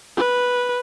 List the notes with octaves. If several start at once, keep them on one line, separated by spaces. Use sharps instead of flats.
B4